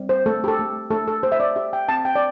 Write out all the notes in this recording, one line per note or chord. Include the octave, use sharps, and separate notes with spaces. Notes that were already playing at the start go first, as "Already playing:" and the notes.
Already playing: G3 C4
C5
A3 A4
G4
A4
A3
A3 A4
A4
G4 C5
E5
D5
G4 E5
G5
C4 A5
G5
D5